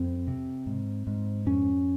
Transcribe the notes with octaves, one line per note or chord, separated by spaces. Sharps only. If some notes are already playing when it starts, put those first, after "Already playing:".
Already playing: F2 C4
C3
G#2
G#2
F2 C#4